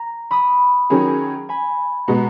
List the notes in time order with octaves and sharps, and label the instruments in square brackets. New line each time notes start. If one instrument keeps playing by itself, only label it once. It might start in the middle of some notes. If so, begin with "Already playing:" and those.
Already playing: [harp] A#5
B5 D#6
[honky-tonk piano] D#3 F#3 C#4 G#4
[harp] G#5 B5
[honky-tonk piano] B2 G#3 B3 [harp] F#5 A#5